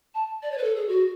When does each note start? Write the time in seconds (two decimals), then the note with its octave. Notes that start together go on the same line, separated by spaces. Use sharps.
0.15 A5
0.43 D5
0.51 C#5
0.58 B4
0.64 A4
0.76 G#4
0.88 F#4